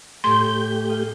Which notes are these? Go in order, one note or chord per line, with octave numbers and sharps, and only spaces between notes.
A2 A3 G4 G#5 C6 G6
F5 D#6 D#7